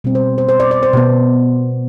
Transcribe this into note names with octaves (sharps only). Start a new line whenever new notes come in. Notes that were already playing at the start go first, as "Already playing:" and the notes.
B2 G3 C4
C5
C5
C5
D5
D5
C5
B2 B3